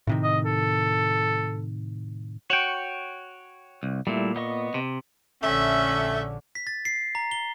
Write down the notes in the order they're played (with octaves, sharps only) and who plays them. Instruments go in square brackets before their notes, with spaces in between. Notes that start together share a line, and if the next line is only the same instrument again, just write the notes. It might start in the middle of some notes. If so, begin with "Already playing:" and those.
[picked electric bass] A2 C3 D#3
[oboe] D#5
A4
[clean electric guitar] F#4 [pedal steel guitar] C#5 G5
[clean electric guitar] C2
[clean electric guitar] A#2 [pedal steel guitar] G3 A3 E4
[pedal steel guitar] B3 D#5 C#6
[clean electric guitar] C3
[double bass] A#1 D3 [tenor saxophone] A3 [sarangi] C#4 [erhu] E5
[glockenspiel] B6
A6
C7
A#5
G7